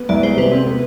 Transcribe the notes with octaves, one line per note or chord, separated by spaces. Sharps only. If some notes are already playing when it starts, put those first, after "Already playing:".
Already playing: B3
C2 D5
G#3 C5
C3 B4
C4
B3